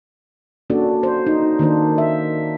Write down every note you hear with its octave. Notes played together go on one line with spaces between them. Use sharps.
A#3 C#4 D4 F#4 A4 D5
C5
D#4
D#3 A#3 D4 C5
E5